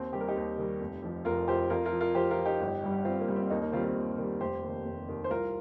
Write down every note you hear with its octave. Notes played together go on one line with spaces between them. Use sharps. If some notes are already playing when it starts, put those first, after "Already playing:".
Already playing: D#2 C4
D#3 G3 G4
A#4
D#4 G4
D#2
D#3 G3
F1
F2 F3
F1 F4 A#4
F2 F3 G4 C5
F2 F4 A#4
F4 A#4
F3
F4 A#4
F2 G4 C5
F4 A#4
F3
D#4 G4
G1
G2 G3
G1 C4 F4
A#3
G2 G3
C4
D#2 A#3 D#4
A#3 D#4
D#3 G3 C4 F4
C4 F4
D#2
D#3 G3
F1 G4 C5
D#2 D#3
F1
D#2 D#3
C5
C2 F4 A#4